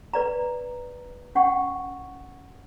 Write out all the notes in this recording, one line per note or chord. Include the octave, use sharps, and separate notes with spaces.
B4 D5 A#5
C#4 F#5 G5 C#6